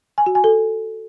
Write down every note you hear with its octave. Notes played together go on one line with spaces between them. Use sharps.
G#5
F#4
G#5
A4